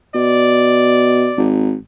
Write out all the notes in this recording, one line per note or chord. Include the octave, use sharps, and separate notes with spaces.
B2 D5
G#1